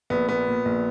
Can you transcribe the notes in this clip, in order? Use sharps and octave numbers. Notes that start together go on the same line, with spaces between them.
A#1 B3
A#2 B3
A#2
A#1